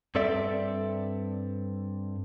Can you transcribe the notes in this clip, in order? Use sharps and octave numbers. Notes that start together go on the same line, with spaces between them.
G2 C4 A4 D5 E5